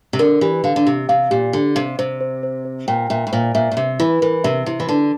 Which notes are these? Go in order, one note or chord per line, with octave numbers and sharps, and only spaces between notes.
C3
D3 A#4
E3 G4
D3 F5
D3
C3 G4
C3 F5
A#2 G4
D3 G4
C3 F5
C3 C5
C5
C5
C5
A#2 G5
A#2 E5
A2
A#2 C5
A#2 E5
A#2
C3 E5
E3 E4
E3 A#4
C3 E5
C3 E4
E3
D3 A5